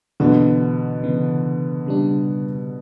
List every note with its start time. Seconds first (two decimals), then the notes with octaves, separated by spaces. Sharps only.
0.20 B2 D3 E3 B3 F#4
1.03 C#3 E3 B3
1.86 C#3 G3 D4